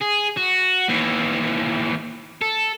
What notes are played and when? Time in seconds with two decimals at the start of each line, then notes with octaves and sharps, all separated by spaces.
0.01 G#4
0.37 F#4
0.89 D#2 E3
2.41 A4